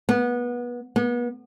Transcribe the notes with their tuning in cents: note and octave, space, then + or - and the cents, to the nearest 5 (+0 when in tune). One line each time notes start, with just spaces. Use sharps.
B3 -25
B3 -35